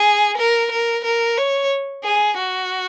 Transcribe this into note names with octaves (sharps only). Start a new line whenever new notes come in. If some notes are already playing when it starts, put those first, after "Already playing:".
Already playing: G#4
A#4
A#4
A#4
C#5
G#4
F#4